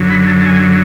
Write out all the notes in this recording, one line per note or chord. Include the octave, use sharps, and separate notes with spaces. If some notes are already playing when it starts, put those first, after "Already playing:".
Already playing: F#2 D3 F#3
B5
A5
A5
G#5